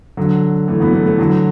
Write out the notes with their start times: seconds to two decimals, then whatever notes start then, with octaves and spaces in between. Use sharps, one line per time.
0.17 D3 F#3
0.68 E3 A3
0.80 F#3 B3
0.93 E3 A3
1.06 E3 A3
1.18 D3 F#3